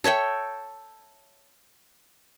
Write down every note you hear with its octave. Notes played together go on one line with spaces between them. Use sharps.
A4 C#5 E5 G5